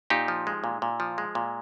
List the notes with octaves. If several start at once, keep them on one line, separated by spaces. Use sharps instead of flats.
A#2 D#4 G4
F3
G#3
A#2
A#2
F3
G#3
A#2